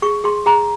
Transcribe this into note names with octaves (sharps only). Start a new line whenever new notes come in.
G#4 C#6
G#4 C6
G#4 A#5